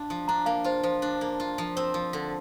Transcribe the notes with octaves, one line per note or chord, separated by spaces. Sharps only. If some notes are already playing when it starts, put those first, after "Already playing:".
Already playing: D4 F4
F3
D4 A#5
A#3 F5
F4 C5
F3 C5
D4
A#3
F4
F3
C4 C5
F3
D3